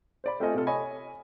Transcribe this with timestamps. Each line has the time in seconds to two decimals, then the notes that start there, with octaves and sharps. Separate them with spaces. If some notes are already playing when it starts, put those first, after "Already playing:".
0.24 C5 D5 B5
0.40 A3 C4 F4 A4 D#5 G#5
0.54 C3 F4 A4
0.67 C#5 D#5 G#5 B5